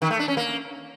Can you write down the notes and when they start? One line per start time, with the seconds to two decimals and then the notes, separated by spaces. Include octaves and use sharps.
0.02 D#3
0.10 A3
0.19 D4
0.28 C#4
0.37 A#3